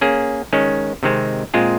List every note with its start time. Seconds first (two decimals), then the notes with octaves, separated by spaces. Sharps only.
0.01 A#3 C#4 G#4
0.53 D#3 G#3 C#4
1.03 C3 D#3 G#3 C4
1.54 A#2 G#3 C4 F4 G#4